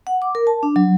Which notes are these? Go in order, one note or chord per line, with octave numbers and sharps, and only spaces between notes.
F#5
D6
A#4
A5
D4
F#3